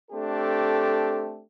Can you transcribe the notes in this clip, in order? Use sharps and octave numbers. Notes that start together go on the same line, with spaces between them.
A3 C4 D4 G4 A4